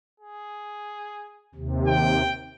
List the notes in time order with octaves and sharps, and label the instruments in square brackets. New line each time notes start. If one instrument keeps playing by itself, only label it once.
[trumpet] G#4
[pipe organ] D#2 C3
[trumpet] G5